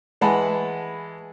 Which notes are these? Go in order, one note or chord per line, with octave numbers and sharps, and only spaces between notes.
E3 G#3 F#5 A5 B5